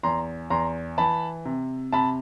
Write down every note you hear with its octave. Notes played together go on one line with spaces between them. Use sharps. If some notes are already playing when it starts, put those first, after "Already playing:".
E2 A#5 C6
E2 A#5 C6
E3 A5 B5
C3
C3 A5 B5